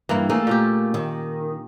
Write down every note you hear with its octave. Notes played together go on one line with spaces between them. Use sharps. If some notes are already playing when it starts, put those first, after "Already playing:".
G2 E3 A#3 E4
A3 A#3 G#4
A#2 C#4 G4
D#3